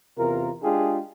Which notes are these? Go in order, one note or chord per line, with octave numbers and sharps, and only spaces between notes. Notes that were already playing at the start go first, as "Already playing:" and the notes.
E2 C3 F4 A#4
G#3 D4 F4 G4 G#4